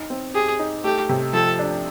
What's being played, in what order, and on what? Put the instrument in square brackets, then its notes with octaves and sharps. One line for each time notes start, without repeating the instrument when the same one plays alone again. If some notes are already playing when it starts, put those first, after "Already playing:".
Already playing: [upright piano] D#4
C4
[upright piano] G4 [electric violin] G#4
[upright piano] D#4
[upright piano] A3 [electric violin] G4
[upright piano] C3
[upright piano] F3 [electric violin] A4
[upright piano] D4